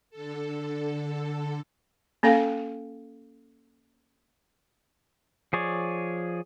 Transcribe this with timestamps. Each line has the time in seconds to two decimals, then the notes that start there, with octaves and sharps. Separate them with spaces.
0.10 D3 A4
2.23 A#3 C#4 A4 F5 G5
5.53 F3 G#4 C#5 D5